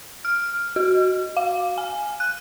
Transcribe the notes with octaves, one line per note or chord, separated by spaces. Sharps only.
F6
F#4
F5
G#5
F#6